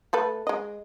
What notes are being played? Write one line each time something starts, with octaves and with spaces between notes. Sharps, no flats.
A3 A4 B4
G#3 D#5